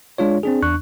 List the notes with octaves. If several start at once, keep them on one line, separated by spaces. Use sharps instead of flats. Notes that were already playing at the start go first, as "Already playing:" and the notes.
G#3 D4 F4 C#5
C4 D4 G#4
E2 D4 C#6 F#6